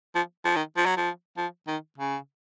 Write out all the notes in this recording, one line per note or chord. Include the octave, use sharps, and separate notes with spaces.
F3
F3
D#3
F3
F#3
F3
F3
D#3
C#3